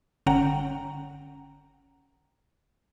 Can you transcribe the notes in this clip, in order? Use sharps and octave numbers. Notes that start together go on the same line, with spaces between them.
G1 D3 C#4 F#5 G5 A#5